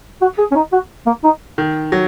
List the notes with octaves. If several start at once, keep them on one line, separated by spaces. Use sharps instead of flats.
F#4
G#4
C#4
D#4
F#4
A#3
D#4
D#3
F#3